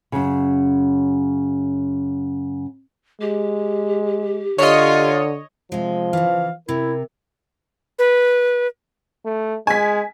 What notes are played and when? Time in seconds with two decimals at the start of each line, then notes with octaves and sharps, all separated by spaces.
0.12 F#2 C#3
3.21 G#3 G4
4.58 D3 F4 C#5 D#5
5.72 C3 F3 G#3
6.13 C#3 E3 F5
6.69 C3 E4 A#4
7.99 B4
9.25 A3
9.67 G#3 G#5 B6